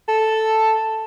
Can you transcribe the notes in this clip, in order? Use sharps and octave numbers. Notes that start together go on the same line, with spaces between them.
A4